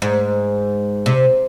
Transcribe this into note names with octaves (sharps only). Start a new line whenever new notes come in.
G#2
C3